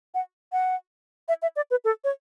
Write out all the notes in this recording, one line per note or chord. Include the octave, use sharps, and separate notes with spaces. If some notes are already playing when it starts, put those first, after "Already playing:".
F#5
F#5
E5
E5
D5
B4
A4
C#5